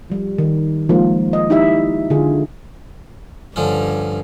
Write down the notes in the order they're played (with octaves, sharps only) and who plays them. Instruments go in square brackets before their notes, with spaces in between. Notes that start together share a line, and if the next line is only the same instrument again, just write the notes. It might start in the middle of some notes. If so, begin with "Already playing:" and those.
[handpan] F3 G3
D#3
F3 G#3 A#3 D#4 F4
D#5
D#4 E4 G4 E5
D3 F4 G#4
[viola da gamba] G2 [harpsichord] D3 F3 C#4